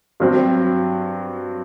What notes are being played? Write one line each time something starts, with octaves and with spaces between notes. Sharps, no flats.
G2 F#3 C4